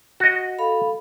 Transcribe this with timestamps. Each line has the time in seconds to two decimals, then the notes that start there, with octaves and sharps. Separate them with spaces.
0.20 F#4 D#5
0.59 A4 F5 B5